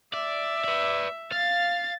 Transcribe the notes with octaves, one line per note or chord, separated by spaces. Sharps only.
D5 E5
B4 D5
F5 A6